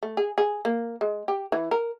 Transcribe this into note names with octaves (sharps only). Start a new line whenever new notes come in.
A3
G#4
G#4
A#3
G#3
G4
E3
A#4